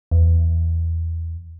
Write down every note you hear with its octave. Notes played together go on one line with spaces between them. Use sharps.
E2